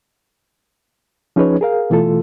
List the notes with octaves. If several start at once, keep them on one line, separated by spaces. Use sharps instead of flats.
F3 C#4 D#4 G#4 B4 C#5
G#4 A#4 F5
B2 E3 A3 F4 A4